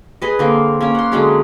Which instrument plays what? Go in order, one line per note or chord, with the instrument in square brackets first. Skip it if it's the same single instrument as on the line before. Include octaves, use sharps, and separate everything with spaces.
[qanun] G#4 B4 D#5
D3 A#3 C4
A#3 C#4
F#5 C6
D3 F#3 G#3 C#4